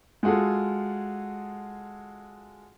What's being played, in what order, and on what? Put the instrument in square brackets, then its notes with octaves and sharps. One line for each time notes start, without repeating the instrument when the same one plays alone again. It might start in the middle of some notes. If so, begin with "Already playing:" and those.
[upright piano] G#3 F4 F#4 G#4 A4